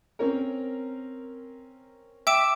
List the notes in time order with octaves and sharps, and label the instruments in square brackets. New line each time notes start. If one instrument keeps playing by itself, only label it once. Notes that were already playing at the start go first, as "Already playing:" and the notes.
[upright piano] C4 C#4 A#4
[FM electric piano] E5 E6 [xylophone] G5 D6 D7